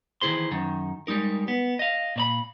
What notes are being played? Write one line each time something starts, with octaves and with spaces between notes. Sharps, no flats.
D#3 E3 E4 G#4 C5 C6
F#2 D#3
G3 G#3 D#4 A#4
B3
D#5 F5
A#2 C#5 B5